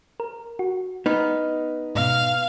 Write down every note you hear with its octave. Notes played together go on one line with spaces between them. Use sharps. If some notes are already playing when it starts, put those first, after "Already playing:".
A#4
F#4
B3 D#4 F6
G#2 B2 F5